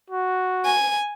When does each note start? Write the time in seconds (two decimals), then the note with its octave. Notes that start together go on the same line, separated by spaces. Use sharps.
0.10 F#4
0.65 G#5